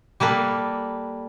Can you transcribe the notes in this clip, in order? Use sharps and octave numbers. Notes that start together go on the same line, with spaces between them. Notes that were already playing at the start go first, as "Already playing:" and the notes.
G3 A#3 A4 B4